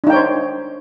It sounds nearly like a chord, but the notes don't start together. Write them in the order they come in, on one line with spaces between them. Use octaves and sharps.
D4 D#4 G5 C#5 C5